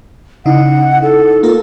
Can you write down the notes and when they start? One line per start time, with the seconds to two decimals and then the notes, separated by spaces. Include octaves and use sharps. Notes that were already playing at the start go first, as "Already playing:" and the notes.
0.46 C#3 D#4 E4 F#5
1.02 A4
1.43 A#3 F4 A#4